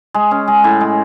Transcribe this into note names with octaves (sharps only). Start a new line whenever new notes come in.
G#3
C#4
G#3
A2
G#3